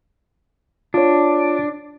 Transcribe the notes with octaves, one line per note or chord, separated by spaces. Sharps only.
D4 F4 C#5